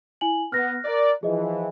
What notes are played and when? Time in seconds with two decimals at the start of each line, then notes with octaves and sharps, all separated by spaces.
0.21 E4 G#5 F#7
0.52 B3 F6 F#6 A#6
0.85 A#4 D5
1.23 E3 F3 G#4 D#5